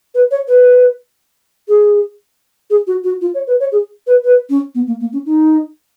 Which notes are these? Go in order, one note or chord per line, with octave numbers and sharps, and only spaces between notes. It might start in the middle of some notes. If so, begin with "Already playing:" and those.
B4
C#5
B4
G#4
G#4
F#4
F#4
F4
C#5
B4
C#5
G#4
B4
B4
C#4
B3
A#3
A#3
C#4
D#4